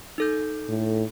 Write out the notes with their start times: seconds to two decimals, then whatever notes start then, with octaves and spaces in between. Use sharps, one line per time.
0.18 D#4 A4 G6
0.68 A2